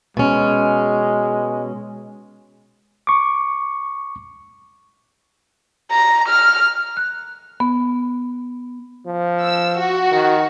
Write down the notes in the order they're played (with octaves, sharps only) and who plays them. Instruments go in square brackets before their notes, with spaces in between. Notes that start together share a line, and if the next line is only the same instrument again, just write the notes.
[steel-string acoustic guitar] B2 C#4 [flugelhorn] G#3
[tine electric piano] C#6 D6
[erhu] A#5
F6
[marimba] F#6
B3
[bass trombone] F3
[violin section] E6
F#4
[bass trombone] D#3